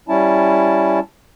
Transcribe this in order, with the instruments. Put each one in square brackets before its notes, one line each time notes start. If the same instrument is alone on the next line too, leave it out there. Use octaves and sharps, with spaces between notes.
[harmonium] G3 C#4 E4 A5